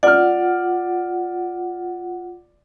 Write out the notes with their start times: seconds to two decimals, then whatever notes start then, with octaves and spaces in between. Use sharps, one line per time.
0.03 F4 D5 F#5 F6